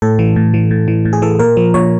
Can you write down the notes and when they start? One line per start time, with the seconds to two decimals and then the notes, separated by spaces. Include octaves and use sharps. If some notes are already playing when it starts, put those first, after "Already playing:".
0.02 A2 A4
0.19 E3
0.36 A2
0.54 E3
0.71 A2
0.88 E3
1.05 A2
1.13 G#4
1.22 E3 A4
1.39 A#2 A#4
1.57 F3
1.74 A#2 C#5